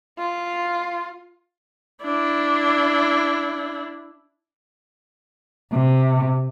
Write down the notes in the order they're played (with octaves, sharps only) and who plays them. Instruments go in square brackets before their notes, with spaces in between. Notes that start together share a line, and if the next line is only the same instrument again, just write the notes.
[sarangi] F4
[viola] D4 E4
[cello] C3